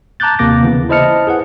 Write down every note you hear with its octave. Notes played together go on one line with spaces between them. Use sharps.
A5 A#5 D6 F#6 G6 A6
D#2 C3 A#3 D6 A#6
C#3 E3 B3
E4 C5 D#5 A5 F6 C#7
G#4 B4 F#5